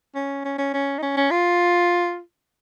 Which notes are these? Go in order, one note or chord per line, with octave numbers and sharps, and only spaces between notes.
C#4
C#4
C#4
C#4
D#4
C#4
C#4
F4